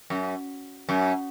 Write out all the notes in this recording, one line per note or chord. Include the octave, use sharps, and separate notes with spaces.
F#2
F#2